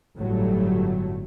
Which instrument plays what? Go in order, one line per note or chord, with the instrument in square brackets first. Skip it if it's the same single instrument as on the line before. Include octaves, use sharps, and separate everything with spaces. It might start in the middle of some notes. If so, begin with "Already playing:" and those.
[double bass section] G1 A2 F#3 G3 A3